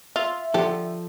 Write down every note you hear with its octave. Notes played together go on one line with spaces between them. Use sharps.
F4 E5
D3 F3 G4 A4